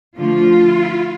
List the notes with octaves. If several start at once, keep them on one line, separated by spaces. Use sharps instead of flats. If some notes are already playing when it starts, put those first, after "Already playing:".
D3 F3 A3 F4